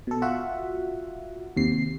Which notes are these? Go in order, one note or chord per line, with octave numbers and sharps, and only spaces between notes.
B2 A4
F4 F#4 E5 F#5
D#2 C3 C7